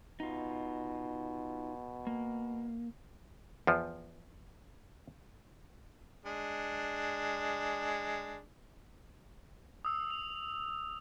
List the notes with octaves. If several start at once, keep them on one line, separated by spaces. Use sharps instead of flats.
B2 D#4 F4
A#3
E2 F3
G#3 D4
D#6 E6
F7